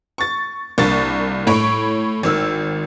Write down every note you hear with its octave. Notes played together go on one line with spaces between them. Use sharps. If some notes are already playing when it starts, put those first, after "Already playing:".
C#6 A6
C2 A#3 D4 C#6 A6
A2 C#5 B5 C#6 D7
G#1 D#3 E6